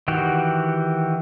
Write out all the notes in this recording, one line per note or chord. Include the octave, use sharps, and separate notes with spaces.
D#3 E3 F#4 G4